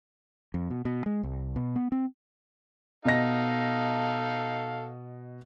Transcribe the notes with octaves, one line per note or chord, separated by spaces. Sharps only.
F2
B2
B2
G#3
C2
B2
B3
C4
B2 D#4 A4 D#5 F5 A#6